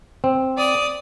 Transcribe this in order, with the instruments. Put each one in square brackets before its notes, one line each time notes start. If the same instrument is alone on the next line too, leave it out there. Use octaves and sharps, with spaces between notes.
[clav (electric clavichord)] C4
[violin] D5 D#6